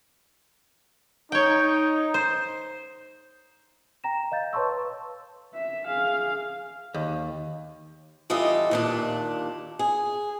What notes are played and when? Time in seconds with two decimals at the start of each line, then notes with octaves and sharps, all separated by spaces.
1.32 D#4 C#5 G5
2.14 C5
4.04 G5 A#5 A#6 E7
4.32 D#5 F5 G6 A6
4.53 B4 C#5 A5 C6 C#6 E6
5.54 E5
5.86 G#4 F5
6.94 D#2
8.30 E3 G3 F4 A4 D#5 E5
8.71 D#2 A#2 D4
9.79 G#4